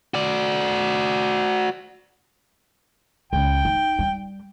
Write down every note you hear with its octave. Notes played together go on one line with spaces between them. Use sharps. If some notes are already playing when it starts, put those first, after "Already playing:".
F#4 D5
C#2 G5
D#4
G3